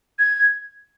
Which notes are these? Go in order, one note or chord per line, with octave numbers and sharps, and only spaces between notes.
G#6